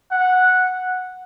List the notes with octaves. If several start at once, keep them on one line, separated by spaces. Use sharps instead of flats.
F#5